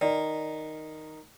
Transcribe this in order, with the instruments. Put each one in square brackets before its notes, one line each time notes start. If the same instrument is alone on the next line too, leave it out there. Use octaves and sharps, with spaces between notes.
[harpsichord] D#3 [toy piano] D5